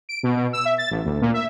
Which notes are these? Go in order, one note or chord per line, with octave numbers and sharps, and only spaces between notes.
D7
B2
B2
E6
E5
A6
A1
D2
A#2
E5